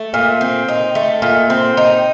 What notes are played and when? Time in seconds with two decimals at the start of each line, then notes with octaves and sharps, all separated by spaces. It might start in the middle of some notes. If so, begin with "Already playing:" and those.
Already playing: A3
0.14 A#2
0.41 C4
0.68 D#4
0.95 A3
1.22 A#2
1.50 C4
1.77 D#4